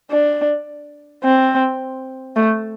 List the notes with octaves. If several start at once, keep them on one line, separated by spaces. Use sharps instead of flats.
D4
C4
A3